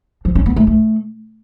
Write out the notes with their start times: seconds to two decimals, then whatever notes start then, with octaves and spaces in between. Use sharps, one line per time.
0.25 F3
0.35 C#4
0.46 B3
0.56 A3
0.67 A3